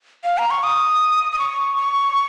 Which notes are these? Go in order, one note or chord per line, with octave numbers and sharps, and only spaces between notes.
F5
A#5
C#6
D#6
D#6
C#6
C#6